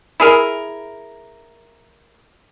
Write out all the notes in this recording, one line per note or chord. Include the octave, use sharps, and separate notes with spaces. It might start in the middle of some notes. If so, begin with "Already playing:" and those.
E4 G#4 A#4